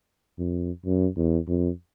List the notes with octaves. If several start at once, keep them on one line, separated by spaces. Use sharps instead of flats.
F2
F#2
E2
F2